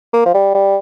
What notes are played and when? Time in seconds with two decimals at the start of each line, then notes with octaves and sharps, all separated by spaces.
0.13 A#3
0.26 F3
0.34 G3
0.54 G3